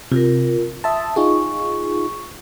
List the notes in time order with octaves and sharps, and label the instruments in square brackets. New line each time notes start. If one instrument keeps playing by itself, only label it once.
[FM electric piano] C3 [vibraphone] F4 A#4
[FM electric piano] E5 A5 [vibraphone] C6 D#6
[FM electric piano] D#4 F4 G#4 [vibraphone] C#6